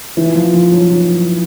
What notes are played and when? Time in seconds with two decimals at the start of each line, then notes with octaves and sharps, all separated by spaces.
0.17 E3
0.35 F3
0.54 F3
0.72 F#3
0.91 F#3